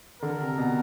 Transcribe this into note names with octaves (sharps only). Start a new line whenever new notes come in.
D3 A#4
C3
B2